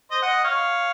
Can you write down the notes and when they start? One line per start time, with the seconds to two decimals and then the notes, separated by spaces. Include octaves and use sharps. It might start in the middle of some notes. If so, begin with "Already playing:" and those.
0.11 C5 D#5
0.22 D#5 F#5
0.44 C#5 F5